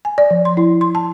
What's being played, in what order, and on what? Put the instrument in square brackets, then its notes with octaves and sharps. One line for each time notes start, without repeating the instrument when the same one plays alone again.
[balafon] G#5
D5
F3
C6
E4
C6
A5